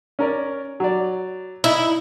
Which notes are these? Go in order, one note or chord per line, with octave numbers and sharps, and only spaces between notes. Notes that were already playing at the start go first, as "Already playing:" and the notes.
C#4 A#4 D5
F#3 D5
D#4 E4